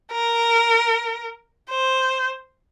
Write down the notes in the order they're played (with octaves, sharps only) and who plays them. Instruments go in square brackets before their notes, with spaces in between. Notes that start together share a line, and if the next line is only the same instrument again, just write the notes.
[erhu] A#4
C5